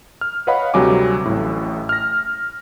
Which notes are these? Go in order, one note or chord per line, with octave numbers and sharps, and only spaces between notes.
F6
B4 C#5 D#5 F5 F#5 B5
D2 C3 F#3 G3 G#5 D6
A1 A2
F6 A#6